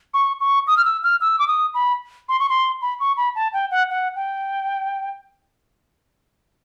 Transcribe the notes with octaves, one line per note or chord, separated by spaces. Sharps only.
C#6
C#6
D#6
F6
E6
F6
E6
D6
D#6
B5
C6
C#6
C6
B5
C#6
B5
A5
G5
F#5
F#5
G5